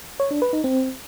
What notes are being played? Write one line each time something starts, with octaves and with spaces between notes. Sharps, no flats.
C#5
D4
B4
D#4
C4